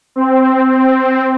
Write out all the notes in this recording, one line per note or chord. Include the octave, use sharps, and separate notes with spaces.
C4
C4